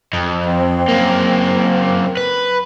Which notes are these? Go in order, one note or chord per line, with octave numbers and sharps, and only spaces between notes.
F2
C4
F#2 A#3
B4